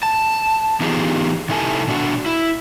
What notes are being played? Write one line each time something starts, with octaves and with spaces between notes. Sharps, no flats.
A5
E3 B3 D#4 F4 G4 G#4
C3 D#4 E4 A4 G#5
B2 D4 F#4
E4